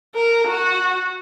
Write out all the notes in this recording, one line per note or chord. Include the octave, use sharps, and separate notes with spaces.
A#4
F#4